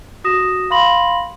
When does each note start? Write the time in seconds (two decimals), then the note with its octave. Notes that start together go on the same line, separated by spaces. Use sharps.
0.24 F#4 D#6 A#6 E7
0.70 F5 B5 C6 A#6 F#7